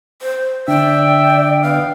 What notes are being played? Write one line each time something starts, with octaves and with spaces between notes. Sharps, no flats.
C5
D3 D5 E5 G5
B3 F5